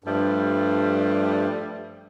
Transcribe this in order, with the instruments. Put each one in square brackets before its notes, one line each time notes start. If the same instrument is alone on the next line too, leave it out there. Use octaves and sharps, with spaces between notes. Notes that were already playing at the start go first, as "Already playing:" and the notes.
[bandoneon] G2 [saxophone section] F3 G3 A3